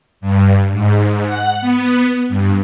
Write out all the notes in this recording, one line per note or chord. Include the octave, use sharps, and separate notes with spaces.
G2
G#2
F#5
B3
G2